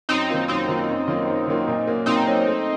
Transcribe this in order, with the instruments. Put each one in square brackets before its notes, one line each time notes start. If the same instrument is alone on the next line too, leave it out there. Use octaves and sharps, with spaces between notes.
[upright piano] F#2 [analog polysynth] C4 D#4
[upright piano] D#3 A#3 F4
[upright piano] F#2 [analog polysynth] C4 D#4
[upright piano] D#3 A#3 F4
F#2
D#3 F#3 A#3 F4
F#2
D#3 F#3 A#3 F4
A#2
F#3 A#3 C#4
[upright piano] A#2 [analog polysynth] C4 D#4
[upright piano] F#3 A#3 C#4
A3